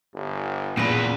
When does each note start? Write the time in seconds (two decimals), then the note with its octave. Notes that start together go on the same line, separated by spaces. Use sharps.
0.14 G1
0.77 E2 A#2 C#3 B4